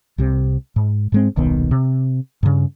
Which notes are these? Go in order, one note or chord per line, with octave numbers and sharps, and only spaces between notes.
C2 C3
G#2
G#2 G#3 C4
D#1 B1 D#3 B3
C3
G2 C#3